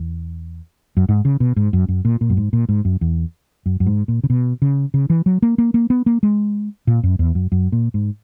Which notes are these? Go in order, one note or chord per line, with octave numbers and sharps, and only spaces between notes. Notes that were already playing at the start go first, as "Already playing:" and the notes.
Already playing: E2
F#2
G#2
C#3
B2
G#2
F#2
F#2
A#2
A#2
F#2
G#2
A#2
G#2
F#2
E2
F#2
F#2
G#2
A#2
C#3
B2
C#3
C#3
E3
F#3
A#3
A#3
A#3
B3
A#3
G#3
A#2
F#2
E2
F#2
F#2
A#2
G#2